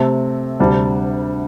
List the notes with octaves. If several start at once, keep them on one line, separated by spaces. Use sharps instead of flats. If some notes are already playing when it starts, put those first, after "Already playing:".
Already playing: C3 A3 C4 A4
D2 C3 G3 D4